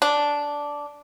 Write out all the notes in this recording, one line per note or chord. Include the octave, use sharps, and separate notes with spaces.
D4